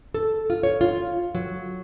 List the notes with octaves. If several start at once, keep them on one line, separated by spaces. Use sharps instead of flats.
A4
F4
C#5
F4
F#3